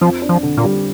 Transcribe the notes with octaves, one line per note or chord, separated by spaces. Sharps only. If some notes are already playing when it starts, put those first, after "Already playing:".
F2 F3
D4
F3
D3
A#2
G3